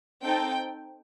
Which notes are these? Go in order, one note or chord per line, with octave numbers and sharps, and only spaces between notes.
C4 D#4 A4 G5